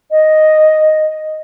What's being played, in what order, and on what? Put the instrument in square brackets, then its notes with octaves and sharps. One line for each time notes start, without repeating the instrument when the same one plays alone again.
[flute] D#5